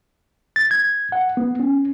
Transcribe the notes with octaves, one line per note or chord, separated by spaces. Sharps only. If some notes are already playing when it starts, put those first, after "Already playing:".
A6
G#6
F#5
B3
C#4